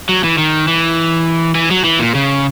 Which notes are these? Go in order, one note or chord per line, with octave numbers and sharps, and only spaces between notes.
F#3
E3
D#3
E3
E3
F#3
E3
A#2
C#3